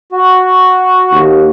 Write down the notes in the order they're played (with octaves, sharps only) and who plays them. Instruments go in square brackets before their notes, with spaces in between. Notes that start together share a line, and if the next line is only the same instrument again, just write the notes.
[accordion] F#4
[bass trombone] D#2